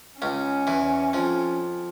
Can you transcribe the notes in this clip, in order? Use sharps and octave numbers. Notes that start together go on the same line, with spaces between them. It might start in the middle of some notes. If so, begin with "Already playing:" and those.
C#2 C#3 C#4
E2 E3
F2 F3